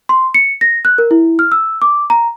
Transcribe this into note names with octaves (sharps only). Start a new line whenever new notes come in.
C6
C#7
A#6
F#6
A#4
E4
F6
E6
D6
A#5